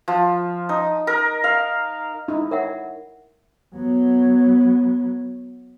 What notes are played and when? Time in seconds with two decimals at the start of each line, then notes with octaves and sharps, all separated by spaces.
0.08 F3
0.69 D#4
1.07 A#4
1.44 F5
2.28 D#4 E4
2.51 A#4 C#5 E5 F#5
3.76 F#3 B3